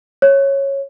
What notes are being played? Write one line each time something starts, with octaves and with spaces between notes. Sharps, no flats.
C#5